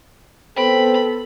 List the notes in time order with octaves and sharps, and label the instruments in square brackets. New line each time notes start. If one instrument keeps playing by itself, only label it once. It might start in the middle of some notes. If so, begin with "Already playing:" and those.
[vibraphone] B3 B4 [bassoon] C4 [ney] A4 [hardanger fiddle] B5